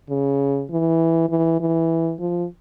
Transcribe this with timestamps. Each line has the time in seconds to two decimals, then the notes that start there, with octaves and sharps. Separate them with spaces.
0.10 C#3
0.71 E3
1.29 E3
1.60 E3
2.20 F3